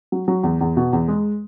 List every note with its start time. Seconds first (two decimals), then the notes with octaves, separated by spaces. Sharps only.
0.12 F#3
0.28 F#3
0.43 E2
0.61 E2
0.77 B2
0.93 E2
1.08 G#3